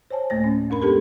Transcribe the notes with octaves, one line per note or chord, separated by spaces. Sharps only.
C5 C#5 G#5 A5
D2 A2 A3 A#3 G#5 A#6
C#4
F2 D4 A#4 B5
G#3 B3 D4 G4 A4 A#4